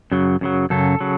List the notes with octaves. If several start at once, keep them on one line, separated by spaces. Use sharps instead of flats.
F#2 C#3 F#3
F#2 C#3 F#3
F#2 C#3 F#3 A4
C#3 F#3